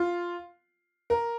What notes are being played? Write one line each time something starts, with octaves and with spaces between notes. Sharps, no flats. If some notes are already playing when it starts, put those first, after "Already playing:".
Already playing: F4
A#4